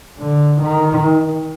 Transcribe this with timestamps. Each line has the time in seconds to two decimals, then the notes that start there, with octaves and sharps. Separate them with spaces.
0.18 D3
0.61 D#3